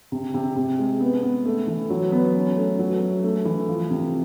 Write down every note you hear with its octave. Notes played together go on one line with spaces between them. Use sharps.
C3
C3
C3
G#3
B3
B3
A3
E3
F#3
B3
C#4
A3
F#3
A3
A3
E3
F3
C3